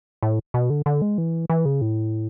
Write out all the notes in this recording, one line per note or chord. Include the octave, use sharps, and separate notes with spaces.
A2
B2
D3
D3
G#3
E3
E3
C#3
A2